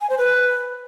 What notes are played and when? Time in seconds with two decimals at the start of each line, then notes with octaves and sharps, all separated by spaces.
0.01 G#5
0.10 C5
0.18 B4